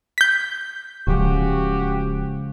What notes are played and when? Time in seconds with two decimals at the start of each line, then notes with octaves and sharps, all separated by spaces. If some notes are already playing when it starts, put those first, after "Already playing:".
0.18 G6 B6
1.07 D1 C#3 F3 G#3 F#4 G4